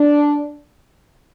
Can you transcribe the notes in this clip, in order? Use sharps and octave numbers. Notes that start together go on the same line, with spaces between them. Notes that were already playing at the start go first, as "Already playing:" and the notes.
Already playing: D4